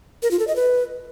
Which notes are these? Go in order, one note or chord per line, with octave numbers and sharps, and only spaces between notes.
A#4
F4
A4
D#5
B4